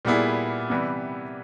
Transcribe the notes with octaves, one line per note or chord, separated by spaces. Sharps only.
A#2 G3 B3 E4 G#4
C3 E3 G3 B3